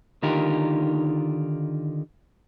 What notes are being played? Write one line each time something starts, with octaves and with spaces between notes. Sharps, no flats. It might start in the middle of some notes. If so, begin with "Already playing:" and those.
D3 D#3 D#4 F4 G4 A#4